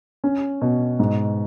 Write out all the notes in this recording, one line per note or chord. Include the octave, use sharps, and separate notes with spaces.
C#4
B2
G#2